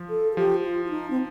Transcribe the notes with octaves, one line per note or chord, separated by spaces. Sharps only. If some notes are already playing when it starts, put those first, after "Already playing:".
Already playing: F3
A4
A4
F3 G4
F4
F4
D#4
C4